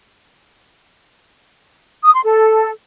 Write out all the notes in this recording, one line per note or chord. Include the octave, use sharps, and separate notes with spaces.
D#6
C6
A4